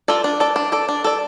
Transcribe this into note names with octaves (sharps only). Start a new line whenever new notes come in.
F4 A4 D5
D4
A4 D5
D4
A4 D5
D4
A4 D5